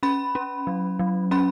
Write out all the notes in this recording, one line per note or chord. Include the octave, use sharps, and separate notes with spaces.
C#4 B5
C#4
F#3
F#3
C#4 B5